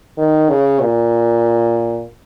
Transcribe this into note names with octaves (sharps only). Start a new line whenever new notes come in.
D#3
C#3
A#2